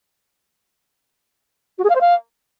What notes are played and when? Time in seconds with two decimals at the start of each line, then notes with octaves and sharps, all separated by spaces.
1.78 F#4
1.84 G#4
1.89 F5
1.95 C5
2.00 F5